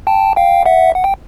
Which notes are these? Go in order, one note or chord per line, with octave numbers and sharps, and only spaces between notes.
G5 A5
F5 G5
E5 F#5
F#5
G5